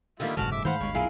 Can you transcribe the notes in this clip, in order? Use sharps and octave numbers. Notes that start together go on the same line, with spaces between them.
D3 D#3 G3 A#3 F4 D#5 E5
F#1 G#2 B2 D3 F#4 A5 F6
E5 D6 E6
D#3 E3 A3 C5 F5 F#5 B5
G1 D2 G#3 C#5
B1 F#2 A#2 E4 F4 G#4 A#4